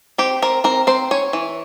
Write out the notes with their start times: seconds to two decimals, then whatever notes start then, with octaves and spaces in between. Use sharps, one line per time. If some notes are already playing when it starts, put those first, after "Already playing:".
0.18 C4 G4
0.42 C4 A#4
0.64 C4 A#4
0.87 C4 C5
1.11 C#4 C#5
1.33 E3